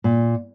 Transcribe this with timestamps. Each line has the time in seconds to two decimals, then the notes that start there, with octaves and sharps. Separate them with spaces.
0.04 A#2